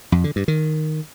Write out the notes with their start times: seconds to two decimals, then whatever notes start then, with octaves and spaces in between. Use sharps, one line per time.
0.12 F2
0.24 D3
0.36 G2
0.48 D#3